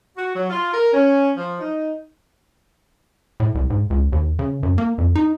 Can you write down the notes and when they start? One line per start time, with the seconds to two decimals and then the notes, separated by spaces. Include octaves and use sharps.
0.17 F#4
0.34 F#3
0.50 F4
0.73 A#4
0.93 C#4
1.37 F3
1.60 D#4
3.40 A2
3.55 C2
3.70 G#2
3.90 C#2
4.12 D#2
4.39 C#3
4.63 F#2
4.78 A#3
4.98 F2
5.15 D#4